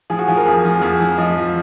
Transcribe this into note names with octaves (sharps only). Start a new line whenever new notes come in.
F3 G#4
F#4
F3 G#4
A#4
F2 G#4
F3
F2 G#4
F3
F3 D#5
F3